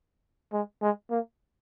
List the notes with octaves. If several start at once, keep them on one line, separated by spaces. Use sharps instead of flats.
G#3
G#3
A#3